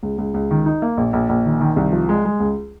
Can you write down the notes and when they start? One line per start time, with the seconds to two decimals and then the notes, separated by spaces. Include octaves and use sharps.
0.03 C#2
0.18 C#2
0.34 C#2
0.51 D#3
0.66 D#4
0.82 A#3
0.97 A#1
1.13 A#1
1.29 A#1
1.45 D#3
1.61 D#3
1.76 C2
1.93 F3
2.09 G#3
2.25 G#3
2.40 C#2